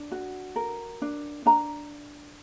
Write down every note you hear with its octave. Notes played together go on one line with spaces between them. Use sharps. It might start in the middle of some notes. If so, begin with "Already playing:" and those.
Already playing: D4
F#4
A#4
D4
D4 A#5